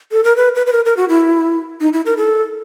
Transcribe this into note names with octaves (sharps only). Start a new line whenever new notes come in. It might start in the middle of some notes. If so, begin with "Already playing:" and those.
A4
A#4
B4
B4
B4
A#4
A#4
F#4
E4
D#4
E4
A#4
A4